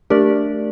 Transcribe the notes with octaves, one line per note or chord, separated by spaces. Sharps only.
A3 D4 G4 A#4 D5